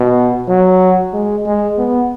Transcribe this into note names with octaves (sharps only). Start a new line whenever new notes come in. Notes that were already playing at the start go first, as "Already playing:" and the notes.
Already playing: B2
F#3
G#3
G#3
B3